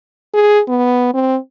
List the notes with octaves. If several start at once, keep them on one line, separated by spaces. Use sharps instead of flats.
G#4
B3
C4